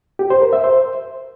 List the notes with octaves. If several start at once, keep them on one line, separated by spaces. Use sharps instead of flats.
G4
C5
A#4
E5
C5